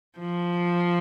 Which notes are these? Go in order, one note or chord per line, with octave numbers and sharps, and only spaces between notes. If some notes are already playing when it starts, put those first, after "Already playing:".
F3